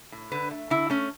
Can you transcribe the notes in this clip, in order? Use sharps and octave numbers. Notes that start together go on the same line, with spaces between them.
A2
D3 B4
A3
D3 E4
A3 C#4